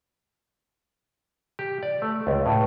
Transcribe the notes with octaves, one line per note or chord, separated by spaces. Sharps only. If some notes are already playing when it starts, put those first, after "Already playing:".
G4
D5
A3
C#2
A2